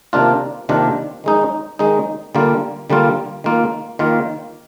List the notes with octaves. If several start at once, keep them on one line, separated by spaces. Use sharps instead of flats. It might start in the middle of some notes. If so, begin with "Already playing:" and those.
C3 D#3 A#3 D4 F4
C3 D#3 A#3 D4 F4
D#3 G#3 D#4
D#3 G#3 D#4
D3 G3 A#3 F4
D3 G3 A#3 F4
D#3 A#3 F4
D#3 A#3 F4